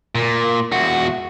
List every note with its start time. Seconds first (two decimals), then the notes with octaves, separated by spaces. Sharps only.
0.15 A#2
0.72 E2 F#4